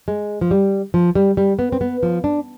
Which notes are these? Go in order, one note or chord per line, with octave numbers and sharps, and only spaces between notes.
G#3
F3
G3
F3
G3
G3
B3
C4
B3
F3
D4